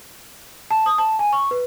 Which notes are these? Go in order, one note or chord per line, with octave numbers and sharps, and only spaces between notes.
A5
D#6
A5
G#5
C#6
B4